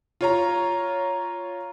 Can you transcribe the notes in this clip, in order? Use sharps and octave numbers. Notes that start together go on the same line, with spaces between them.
F4 C#5 A#5